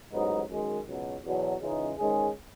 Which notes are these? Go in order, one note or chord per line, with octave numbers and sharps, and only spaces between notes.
A1 G#2 F#3 B3 D#4
F#2 D#3 G#3
C#2 B2 F#3
E2 B2 F#3
C#2 C#3 E3 G#3 D#4
G#2 D#3 G#3 C#4 G#4